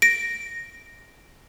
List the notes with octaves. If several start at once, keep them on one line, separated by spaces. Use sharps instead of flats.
A#6 D7